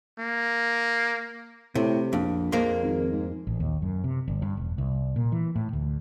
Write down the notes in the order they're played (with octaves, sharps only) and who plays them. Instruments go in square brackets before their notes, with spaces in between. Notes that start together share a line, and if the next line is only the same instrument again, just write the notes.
[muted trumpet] A#3
[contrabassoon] A2 [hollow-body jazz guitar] C3
[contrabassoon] A#1 [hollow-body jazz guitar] F2
[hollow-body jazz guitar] F2 G#3 A#3
[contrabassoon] G#1
G#2
[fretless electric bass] A1
D#2
F#2
C3
G1
G2
E1
C2
A#2
E3
A2
D2